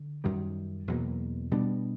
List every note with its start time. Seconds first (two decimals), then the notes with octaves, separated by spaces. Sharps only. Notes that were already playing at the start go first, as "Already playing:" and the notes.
Already playing: D3
0.24 F#2 D#3 G3
0.87 E2 B2 F#3 A#3
1.51 B2 G3 B3 D4